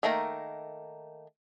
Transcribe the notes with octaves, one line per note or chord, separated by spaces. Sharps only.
D#3 A3 A#3 A#4 A#5